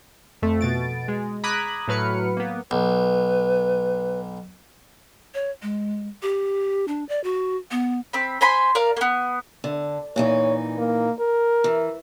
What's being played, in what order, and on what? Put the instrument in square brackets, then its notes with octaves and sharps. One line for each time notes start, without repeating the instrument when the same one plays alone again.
[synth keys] F2 A3
B2 A6 D7
G#3
A#5 B5 D6 D#6 F#6 G#6
A2 F#3 B4 F6 C#7
A#3 B3
[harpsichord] B1 [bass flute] B4
[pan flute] C#5
G#3
G4
D4
D5
F#4
B3
[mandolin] C4 B5
C5 G#5 B5 C6
A#4 D5 F5
A#3 B3
[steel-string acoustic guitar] D3
[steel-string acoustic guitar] A#2 E3 D#4 [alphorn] C#5
[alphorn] A#3
A#4
[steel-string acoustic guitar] E3